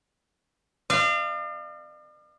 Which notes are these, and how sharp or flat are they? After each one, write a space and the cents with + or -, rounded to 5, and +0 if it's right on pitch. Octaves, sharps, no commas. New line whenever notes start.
D5 +45 F5 -25